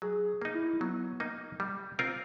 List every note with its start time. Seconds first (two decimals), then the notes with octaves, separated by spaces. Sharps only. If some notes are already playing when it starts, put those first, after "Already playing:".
0.02 F#3 G#4
0.42 A#3 D#4
0.55 E4
0.81 F#3 B3
1.20 A#3 D#4
1.60 G3
1.99 C4 F4 A#4